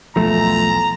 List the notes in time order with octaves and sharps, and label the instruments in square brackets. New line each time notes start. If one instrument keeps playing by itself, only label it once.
[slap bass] B1 E2 [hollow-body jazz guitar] F3 A3 [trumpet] A#5